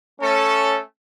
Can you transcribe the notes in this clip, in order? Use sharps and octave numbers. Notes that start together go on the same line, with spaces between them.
A3 C#4 A4